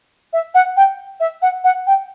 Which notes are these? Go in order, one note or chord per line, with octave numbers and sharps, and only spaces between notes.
E5
F#5
G5
E5
F#5
F#5
G5